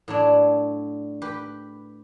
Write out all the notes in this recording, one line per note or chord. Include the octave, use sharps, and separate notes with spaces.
A2 F#3 D4
G4 B4 G5